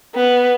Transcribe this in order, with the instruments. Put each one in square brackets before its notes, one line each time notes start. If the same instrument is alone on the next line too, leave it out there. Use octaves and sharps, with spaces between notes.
[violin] B3